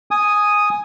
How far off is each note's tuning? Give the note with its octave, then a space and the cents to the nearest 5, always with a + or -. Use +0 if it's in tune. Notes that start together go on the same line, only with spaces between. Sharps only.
G#5 +0 D#6 +0